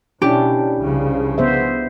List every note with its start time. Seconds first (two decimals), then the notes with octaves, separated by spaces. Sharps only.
0.22 B2 C#4 D4 E4 G4
0.80 C2 C#3 F3
1.38 B3 C5 E5